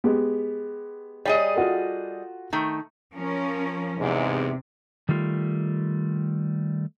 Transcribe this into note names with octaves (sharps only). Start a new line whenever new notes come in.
G#3 B3 G4
G3 G#4 C#5 D#5
F4 F#4 A4
D#3 A3
F3 C#4 A#4
E2 G#2 C3
D#3 G3 A3 F4